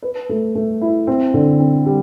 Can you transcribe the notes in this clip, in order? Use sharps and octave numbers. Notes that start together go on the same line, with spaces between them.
B4
A3
A3
E4
C4
D3
C4
G3